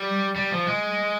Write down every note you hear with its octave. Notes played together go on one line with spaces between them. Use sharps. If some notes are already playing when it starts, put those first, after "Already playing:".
Already playing: G3
G3
F3
G#3